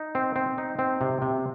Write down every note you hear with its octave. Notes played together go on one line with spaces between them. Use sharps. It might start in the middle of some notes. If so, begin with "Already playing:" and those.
Already playing: D#4
C4
C4
D#4
C4
C3
C3